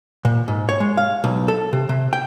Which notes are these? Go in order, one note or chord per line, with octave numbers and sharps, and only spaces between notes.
A#2
G#2
C#5
G#3
F5
B1
A4
C3
C3
G5